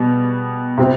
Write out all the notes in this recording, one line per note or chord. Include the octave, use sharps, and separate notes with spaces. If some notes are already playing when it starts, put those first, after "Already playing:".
Already playing: B2 G3 B3
C3 G3 C4 G4